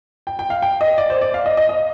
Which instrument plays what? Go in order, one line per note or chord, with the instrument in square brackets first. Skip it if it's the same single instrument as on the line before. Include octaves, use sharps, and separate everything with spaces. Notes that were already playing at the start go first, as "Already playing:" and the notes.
[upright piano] G5
G5
F5
G5
D#5
D5
C5
D5
F5
D#5
D#5
D#5